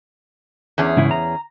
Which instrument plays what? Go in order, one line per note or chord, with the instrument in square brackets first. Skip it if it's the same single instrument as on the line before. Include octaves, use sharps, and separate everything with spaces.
[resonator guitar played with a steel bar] E2 C#4 G#4
[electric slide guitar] G#2 C#3 E4
A#5